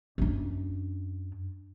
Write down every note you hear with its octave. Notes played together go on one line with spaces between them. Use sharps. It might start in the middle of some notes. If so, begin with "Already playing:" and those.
F#2 D4